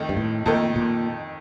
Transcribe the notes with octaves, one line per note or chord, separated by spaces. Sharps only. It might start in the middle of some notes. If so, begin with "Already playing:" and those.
Already playing: F2 D#3 A3 D#4 A4
G2
A2
F2 A#2 D#3 A3 D#4 A4
A#2